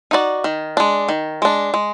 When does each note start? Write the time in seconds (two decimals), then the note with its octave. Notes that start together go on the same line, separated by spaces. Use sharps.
0.11 D#4 F#4 D5
0.44 D#3
0.77 G#3 D4
1.08 D#3
1.42 G#3 D4
1.74 G#3